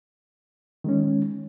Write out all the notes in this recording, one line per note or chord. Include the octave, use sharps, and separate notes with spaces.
D#3 G#3 C#4